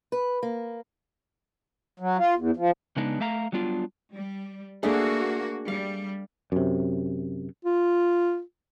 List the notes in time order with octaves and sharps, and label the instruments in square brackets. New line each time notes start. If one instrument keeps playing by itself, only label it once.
[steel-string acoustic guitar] B4
A#3
[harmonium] F#3
F4
E2
F3
[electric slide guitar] C#3 G#3 B3 D4 D#4
A3 E5 F5 A#5
F#3 G3 B3 D4 F4
[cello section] G3
[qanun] A3 D4 G#4 [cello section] A#3 F#4
[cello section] G3 [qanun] F5
[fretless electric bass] F#2 C3
[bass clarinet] F4